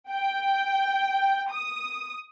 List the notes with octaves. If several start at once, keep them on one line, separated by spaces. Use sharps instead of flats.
G5
D#6